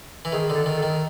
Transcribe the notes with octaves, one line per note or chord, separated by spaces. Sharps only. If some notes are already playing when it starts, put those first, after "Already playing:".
E3
D#3 G#4
D3
A4
D#3
A4
D#3